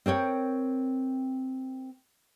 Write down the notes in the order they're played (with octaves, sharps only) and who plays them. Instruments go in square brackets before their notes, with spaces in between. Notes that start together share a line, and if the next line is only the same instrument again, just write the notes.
[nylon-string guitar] C4 A#4 C#5 G5